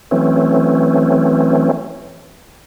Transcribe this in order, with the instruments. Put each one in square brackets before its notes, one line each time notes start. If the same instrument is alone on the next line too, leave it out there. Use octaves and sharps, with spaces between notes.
[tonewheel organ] E3 F#3 A3 C4 C#4